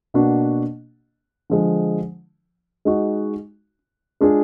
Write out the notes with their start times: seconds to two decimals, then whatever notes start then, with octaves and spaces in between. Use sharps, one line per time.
0.14 B2 A#3 D4 F#4
1.50 D3 F3 G#3
2.85 G#3 D#4 F#4
4.21 G#3 D4 F4 G#4